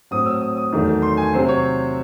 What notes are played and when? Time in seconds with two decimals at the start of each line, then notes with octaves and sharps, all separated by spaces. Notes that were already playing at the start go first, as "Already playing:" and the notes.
0.11 A2 F#3 C4 D#6
0.26 E6
0.41 D#6
0.57 D#6
0.72 E2 D#3 F#3 A3
1.02 C6
1.17 G#5
1.33 C3 F#3 C4 C5
1.48 C#5